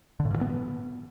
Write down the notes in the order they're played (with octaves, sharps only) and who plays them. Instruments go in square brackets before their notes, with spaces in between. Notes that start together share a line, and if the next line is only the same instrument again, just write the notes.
[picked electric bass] D3
A2
G2
E3
B3